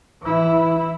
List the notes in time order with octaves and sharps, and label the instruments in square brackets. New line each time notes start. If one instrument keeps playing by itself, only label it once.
[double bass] E3 E4